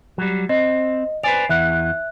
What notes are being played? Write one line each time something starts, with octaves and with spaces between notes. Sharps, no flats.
F#3 G3
C4 D#5
B4 C5 D5 G#5 D7 F7
E2 E3 E5 F#5 F#6